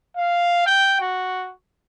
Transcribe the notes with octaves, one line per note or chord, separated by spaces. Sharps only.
F5
G5
F#4